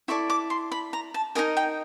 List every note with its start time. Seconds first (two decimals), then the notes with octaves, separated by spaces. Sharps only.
0.08 E4 A4 D5 C#6
0.30 D6
0.50 C6
0.72 B5
0.93 A#5
1.14 A5
1.35 D#4 F#4 A#4 D#5 G#5
1.57 G5